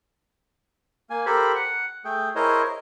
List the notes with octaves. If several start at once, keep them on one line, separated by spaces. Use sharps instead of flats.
A#3 G#5
G4 A4 A#4 C5 B5
F#5
A3 G#4 G5
E4 G#4 A#4 C5 C#5 D#5